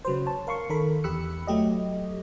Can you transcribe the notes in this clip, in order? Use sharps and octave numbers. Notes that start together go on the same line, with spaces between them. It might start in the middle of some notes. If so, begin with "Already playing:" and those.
C#3 F#3 B4 C5
C#5 A5
A#4 F5 C6 C#6
D#3 A4 A#4 B5
E2 G4 B5 E6 F#6 C#7
F#3 A3 G4 D#5